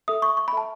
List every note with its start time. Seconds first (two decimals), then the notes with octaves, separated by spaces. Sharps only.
0.08 A4 E5 D#6
0.22 C#6
0.37 C#6
0.48 B5
0.53 A4 E5 A5